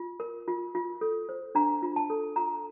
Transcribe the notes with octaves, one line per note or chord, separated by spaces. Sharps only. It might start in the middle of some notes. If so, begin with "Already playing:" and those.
Already playing: F4
A#4
F4
F4
A4
C5
D4 A#5
F4
A5
A4
F4 A#5